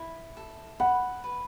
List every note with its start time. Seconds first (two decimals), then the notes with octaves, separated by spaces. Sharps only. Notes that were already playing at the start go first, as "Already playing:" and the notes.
Already playing: E4
0.37 A4
0.80 F#5 B5
1.24 B4